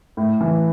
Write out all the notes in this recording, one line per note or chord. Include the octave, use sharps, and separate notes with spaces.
A2
E3